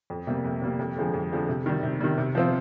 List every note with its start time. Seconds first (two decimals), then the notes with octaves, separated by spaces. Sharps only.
0.10 F2
0.27 C3 G3 A#3
0.45 F2
0.62 C3 G3 A#3
0.79 F2
0.97 D3 F3 G#3
1.14 F2
1.31 D3 F3 G#3
1.49 C3
1.66 D#3 G3
1.83 C3
2.00 D#3 G3
2.18 C3
2.35 F3 C4 F4